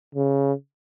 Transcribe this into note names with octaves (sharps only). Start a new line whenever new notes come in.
C#3